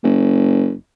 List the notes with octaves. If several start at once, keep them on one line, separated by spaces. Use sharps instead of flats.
F#1